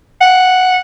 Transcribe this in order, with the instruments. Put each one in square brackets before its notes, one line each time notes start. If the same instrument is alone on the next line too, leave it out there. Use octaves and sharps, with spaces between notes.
[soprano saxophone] F#5